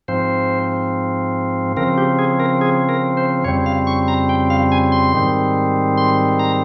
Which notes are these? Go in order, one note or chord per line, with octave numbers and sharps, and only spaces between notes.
G#2 F3 C4 C5
C#3 F3 C4 A#4
G4
G#4
A#4
G#4
A#4
C5
F2 C#3 G3 C4 C#5
F5
C#6
A#5
G5
F5
G#5
C6
G#2 D#3 G3 C4
C6
A#5